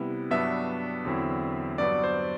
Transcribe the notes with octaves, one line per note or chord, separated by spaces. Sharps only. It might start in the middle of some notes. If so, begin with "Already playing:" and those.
Already playing: C3 G3 B3 E4
G2 F#3 B3 D4 E5
E2 D3 F#3 C4 E4
G2 F#3 B3 D5
C5